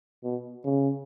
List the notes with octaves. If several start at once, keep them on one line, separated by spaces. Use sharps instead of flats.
B2
C#3